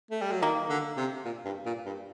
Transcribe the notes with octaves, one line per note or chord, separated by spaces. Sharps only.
A3
G3
F#3
D#3 A#3
D3
C3
A#2
G2
A#2
G2